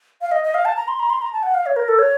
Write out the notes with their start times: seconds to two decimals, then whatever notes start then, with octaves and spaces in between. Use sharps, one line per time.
0.21 F5
0.32 D#5
0.44 D#5
0.54 F5
0.65 A5
0.76 A#5
0.88 C6
1.00 A#5
1.10 C6
1.22 A#5
1.33 A5
1.43 F#5
1.54 F5
1.66 C#5
1.76 A#4
1.88 A4
1.99 C#5